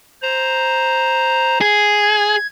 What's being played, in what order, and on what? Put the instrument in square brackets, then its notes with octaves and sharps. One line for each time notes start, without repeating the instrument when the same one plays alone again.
[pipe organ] C5 A#5
[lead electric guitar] G#4 [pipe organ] G#6